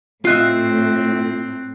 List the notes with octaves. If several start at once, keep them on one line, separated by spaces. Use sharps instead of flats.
A2 C4 F4 D#5 E5 F#6 C7